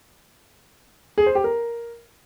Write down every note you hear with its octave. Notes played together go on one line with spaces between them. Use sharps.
G#4
C5
G4
A#4